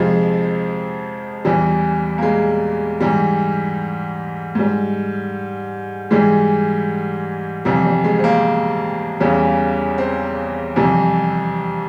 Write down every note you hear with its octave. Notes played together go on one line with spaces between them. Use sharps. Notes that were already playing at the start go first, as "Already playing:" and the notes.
Already playing: F2 C3 F3 G#3
E2 E3 G3
A#3
G#3
G#2 E3 G3
G#2 G3
G#2 E3 G3 G#3
F2 C3 E3 G3
G3
G#3
C4
A#3
E2 C#3 E3 G3
C4
F2 C3 E3 G3